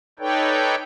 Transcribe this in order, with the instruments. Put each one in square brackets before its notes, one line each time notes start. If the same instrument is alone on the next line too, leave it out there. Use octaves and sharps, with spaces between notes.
[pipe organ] D#4 A4 B4 C#5 D5 G5